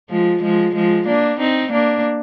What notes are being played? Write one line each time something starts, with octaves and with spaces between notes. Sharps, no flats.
F3 G#3
F3 G#3
F3 G#3
A#3 D4
C4 D#4
A#3 D4